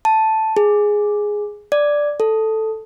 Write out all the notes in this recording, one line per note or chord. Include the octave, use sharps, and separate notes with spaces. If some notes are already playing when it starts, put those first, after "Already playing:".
A5
G#4
D5
A4